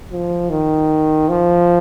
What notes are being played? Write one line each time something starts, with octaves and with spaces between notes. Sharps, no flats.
F3
D#3
F3